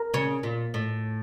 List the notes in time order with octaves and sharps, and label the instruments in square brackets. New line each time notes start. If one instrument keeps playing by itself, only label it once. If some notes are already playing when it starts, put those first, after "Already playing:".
Already playing: [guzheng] A#4
[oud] C#3 [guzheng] C#5
[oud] A#2
A2